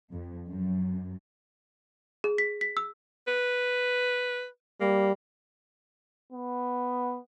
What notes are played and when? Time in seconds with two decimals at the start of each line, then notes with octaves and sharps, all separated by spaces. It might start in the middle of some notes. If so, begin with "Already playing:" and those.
0.12 F2
0.47 F#2
2.24 G#4
2.38 B6
2.61 B6
2.77 E6
3.27 B4
4.81 G3 A#3
6.33 B3